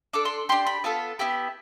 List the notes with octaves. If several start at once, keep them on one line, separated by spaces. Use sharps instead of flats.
D4 A4 D6
C6
D4 G4 C6
B5
B3 F4 A4 A5
B3 E4 G4